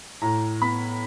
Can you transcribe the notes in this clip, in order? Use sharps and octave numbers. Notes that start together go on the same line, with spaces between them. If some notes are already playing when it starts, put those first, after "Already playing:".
A2 A#5
B3 B5